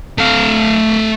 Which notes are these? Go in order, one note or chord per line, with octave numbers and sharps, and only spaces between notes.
A3 F5